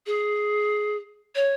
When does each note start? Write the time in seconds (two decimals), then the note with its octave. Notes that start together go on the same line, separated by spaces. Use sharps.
0.06 G#4
1.35 C#5